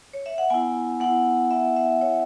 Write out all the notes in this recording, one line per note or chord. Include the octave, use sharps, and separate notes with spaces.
C#5
E5
F#5
B3 E4 G#5
B3 E4 F#5
B3 E4 E5
E5
B3 E4 C#5